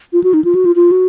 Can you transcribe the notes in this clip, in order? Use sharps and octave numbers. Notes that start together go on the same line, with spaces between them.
F4
F#4
D#4
F4
F#4
F4
F4
F#4